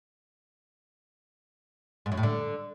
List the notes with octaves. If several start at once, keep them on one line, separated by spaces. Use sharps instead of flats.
G#2
F#2
A2
D3